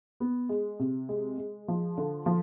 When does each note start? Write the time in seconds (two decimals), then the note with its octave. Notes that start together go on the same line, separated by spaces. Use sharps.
0.20 B3
0.49 G#3
0.79 C3
1.09 G#3
1.38 G#3
1.68 F3
1.98 D3
2.26 F3